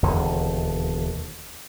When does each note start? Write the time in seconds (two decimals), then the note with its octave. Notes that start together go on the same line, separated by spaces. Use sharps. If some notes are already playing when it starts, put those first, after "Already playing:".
0.03 E1 D#2 D3